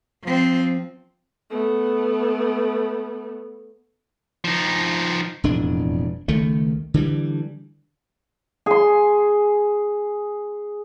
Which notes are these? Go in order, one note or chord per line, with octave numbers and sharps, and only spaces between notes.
F3 C4
A3 B3
F3 D#4
E1 F2 A2 D4
C#2 D#3 A3
D3 E3 G3
G#4 C6